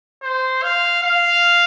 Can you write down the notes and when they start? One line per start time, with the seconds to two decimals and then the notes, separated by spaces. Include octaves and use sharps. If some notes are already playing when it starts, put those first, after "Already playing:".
0.22 C5
0.63 F5
1.03 F5